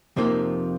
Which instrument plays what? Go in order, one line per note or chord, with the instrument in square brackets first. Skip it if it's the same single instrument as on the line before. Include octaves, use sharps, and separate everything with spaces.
[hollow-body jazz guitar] F2 C3 F3 A#3 D#4